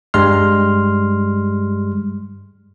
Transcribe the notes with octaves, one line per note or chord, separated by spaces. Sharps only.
G2 G3 G#3 C6 F6